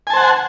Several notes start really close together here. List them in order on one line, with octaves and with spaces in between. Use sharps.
G#5 A5 C5 F#5